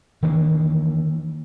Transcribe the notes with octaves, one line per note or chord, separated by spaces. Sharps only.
D#3 E3 A#3 D4